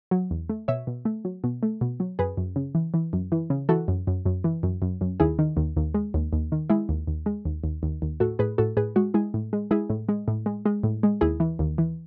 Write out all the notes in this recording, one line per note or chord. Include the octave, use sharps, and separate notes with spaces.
F#3
E2
A3
B2 C#5 E5
B2
A3
F#3
B2
A3
B2
F#3
F#2 G#4 B4
F#2
C#3
E3
E3
F#2
E3
C#3
E3 F#4 A4
F#2
F#2
F#2
E3
F#2
F#2
F#2
D#2 E4 G#4
D#3
D#2
D#2
G#3
D#2
D#2
D#3
G#3 E4 G#4
D#2
D#2
G#3
D#2
D#2
D#2
D#2
A2 F#4 A4
A2 G#4 B4
A2 F#4 A4
A2 G#4 B4
G#3 F#4
G#3 E4 G#4
A2
G#3
G#3 E4 G#4
A2
G#3
A2
G#3
G#3
A2
G#3
D#2 E4 G#4
E3
D#2
E3